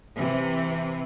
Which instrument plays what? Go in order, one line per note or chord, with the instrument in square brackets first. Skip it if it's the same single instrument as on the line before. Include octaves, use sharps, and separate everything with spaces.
[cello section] C3 E3